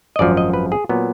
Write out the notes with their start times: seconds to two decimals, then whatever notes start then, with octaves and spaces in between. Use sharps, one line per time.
0.16 D#5
0.19 G#1 F#2 F3 D5
0.37 D#5
0.54 B4
0.72 G#4
0.89 A#2 F#3 B3